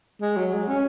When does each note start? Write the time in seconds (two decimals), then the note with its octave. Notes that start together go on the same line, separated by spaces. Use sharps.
0.22 G#3
0.37 F#3
0.54 G#3
0.69 C#4